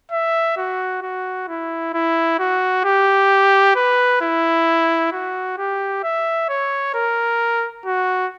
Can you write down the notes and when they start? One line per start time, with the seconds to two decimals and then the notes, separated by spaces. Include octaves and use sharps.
0.12 E5
0.57 F#4
1.03 F#4
1.48 E4
1.94 E4
2.39 F#4
2.84 G4
3.76 B4
4.22 E4
5.13 F#4
5.58 G4
6.03 E5
6.49 C#5
6.94 A#4
7.86 F#4